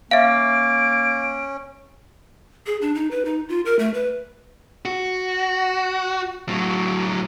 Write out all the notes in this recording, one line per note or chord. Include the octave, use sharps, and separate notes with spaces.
A#3 C#4 E5 F5 D7
G#4
D4
D#4
B4
D#4
F4
A#4
A3
B4
F#4
A2 F#3